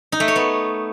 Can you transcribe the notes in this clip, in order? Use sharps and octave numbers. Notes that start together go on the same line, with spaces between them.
D#4
A3
C#5
B3